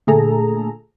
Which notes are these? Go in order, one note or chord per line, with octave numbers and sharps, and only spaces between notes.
A#2 D3 A3 G#4 A4 A#5